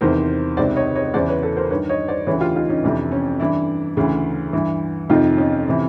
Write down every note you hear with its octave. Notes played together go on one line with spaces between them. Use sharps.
E2 C3 D#3 A#4 C5
C#2 C3 D#3 C5 D5
C#5 D#5
C#5 D#5
E2 C#3 E3 C5 D5
B4 C#5
A4 B4
A#4 C5
G2 D#3 B4 C#5
C#5 D#5
C5 D5
D2 C#3 E3 B4 C#5
F4 G4
D#4 F4
C#4 D#4
F2 C3 E3 D4
C#4
G2 E3 D4 E4
D2 C#3 E3
G2 E3
F2 C3 D#3 D#4 F4
C#4 D#4
C3 E3